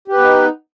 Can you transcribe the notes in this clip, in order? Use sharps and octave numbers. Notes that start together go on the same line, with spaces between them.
B3 D#4 G4 B4